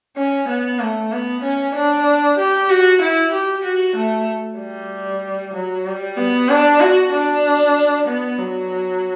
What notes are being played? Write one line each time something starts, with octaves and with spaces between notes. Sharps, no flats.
C#4
B3
A3
B3
C#4
D4
G4
F#4
E4
G4
F#4
A3
G3
F#3
G3
B3
D4
F#4
D4
B3
F#3